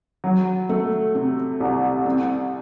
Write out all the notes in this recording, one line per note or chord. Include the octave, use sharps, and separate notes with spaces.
F#3
A3
C3
C2
C4